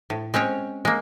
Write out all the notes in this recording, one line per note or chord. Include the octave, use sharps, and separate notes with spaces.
A2
G#3 C4 C#4 C#5
G#3 A#3